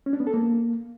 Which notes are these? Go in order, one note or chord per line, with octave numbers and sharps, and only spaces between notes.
C#4
D4
B3
A4
A#3